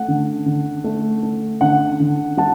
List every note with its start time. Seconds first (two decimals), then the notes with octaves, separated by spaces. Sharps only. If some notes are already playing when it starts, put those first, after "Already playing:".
Already playing: A3 F#5
0.08 D3
0.46 D3
0.84 A3
1.23 A3
1.61 D3 F#5
2.00 D3
2.37 G3 F#5 A5